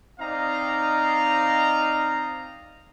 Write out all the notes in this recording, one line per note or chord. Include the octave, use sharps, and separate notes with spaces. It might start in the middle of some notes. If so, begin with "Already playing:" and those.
C4 D#4 D5 D#5 F5 A#5